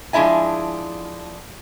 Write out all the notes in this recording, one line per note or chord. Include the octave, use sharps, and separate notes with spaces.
F3 G#3 D4 E4 E5 G#5